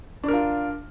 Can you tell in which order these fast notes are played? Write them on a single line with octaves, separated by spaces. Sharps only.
D4 A#4 F4